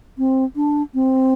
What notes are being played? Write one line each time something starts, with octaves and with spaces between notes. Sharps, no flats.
C4
D4
C4